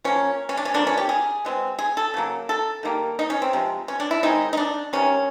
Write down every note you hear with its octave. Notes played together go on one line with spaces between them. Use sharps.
F3 A#3 C#4
C#4
D4
C#4
D3 F3 A#3 D4
C#4
G4
G#4
B2 G#3 C4
G#4
A4
C#3 F#3 A#3
A4
D#3 G3 A#3
D#4
C#4
C4
C3 F3 G#3
C#4
D4
E4
D#3 G#3 C4 D#4
D#4
D4
C3 D#3 G#3 C#4